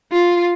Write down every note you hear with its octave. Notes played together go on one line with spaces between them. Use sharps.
F4